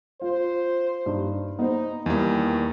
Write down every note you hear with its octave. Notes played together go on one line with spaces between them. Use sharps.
F4 C5
G2 D#4
B3 D#4 C5
E2 D#3 G3 A#3